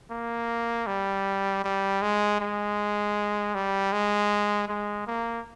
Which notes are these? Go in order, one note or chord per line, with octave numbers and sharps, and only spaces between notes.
A#3
G3
G3
G#3
G#3
G3
G#3
G#3
A#3